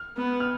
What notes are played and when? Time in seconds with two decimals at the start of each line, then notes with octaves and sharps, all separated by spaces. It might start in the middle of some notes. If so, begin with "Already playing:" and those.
Already playing: F6
0.17 B3
0.40 F6